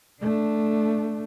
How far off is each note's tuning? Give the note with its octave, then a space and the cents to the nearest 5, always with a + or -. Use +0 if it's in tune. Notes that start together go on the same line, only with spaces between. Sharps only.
A3 +0 D4 +0